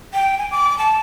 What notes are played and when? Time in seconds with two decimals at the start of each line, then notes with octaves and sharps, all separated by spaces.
0.14 G5
0.38 G#5
0.51 D6
0.78 A5